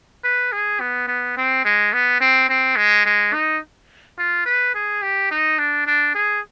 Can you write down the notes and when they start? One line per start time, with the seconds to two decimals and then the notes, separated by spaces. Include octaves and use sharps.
0.24 B4
0.52 G#4
0.80 B3
1.08 B3
1.37 C4
1.65 G#3
1.93 B3
2.21 C4
2.49 C4
2.76 G#3
3.06 G#3
3.33 D#4
4.18 F4
4.46 B4
4.75 G#4
5.02 G4
5.31 D#4
5.58 D4
5.87 D4
6.15 G#4